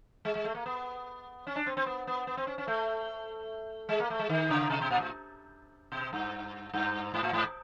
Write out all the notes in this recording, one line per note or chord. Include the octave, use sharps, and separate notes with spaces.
G#3
G#3
A3
A#3
B3
C#4
D4
C4
C4
B3
B3
B3
C4
C#4
C#4
A3
G#3
A#3
A3
G#3
D#3
C#3
C3
B2
A#2
A2
B2
G2
G2
G#2
A2
G#2